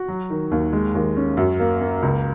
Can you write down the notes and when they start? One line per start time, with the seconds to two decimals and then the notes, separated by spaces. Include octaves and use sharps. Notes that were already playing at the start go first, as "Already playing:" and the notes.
Already playing: F#4
0.08 F#3
0.30 D#3
0.51 D#2
0.73 G#3
0.95 D#2
1.17 C#4
1.37 F#2
1.60 A#3
1.81 A#3
2.02 C#2